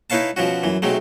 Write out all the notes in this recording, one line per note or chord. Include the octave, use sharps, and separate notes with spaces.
D#4 E4 B4 C#5 F5 A5
B2 F3 C#4 F#4
F#2 E3
B1 C3 F#3 G#3 A3